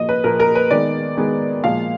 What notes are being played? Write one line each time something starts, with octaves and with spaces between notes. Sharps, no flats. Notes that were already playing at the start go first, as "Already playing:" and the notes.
Already playing: A#2 F3 A#3 D#5
B4
A#2 F3 A#3 A#4
A#4
B4
D#3 G#3 B3 D5
D#3 G#3 B3
A#2 F3 G#3 F5